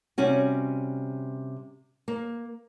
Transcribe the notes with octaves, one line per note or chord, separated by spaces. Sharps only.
C3 G3 C#4 F#4
A#3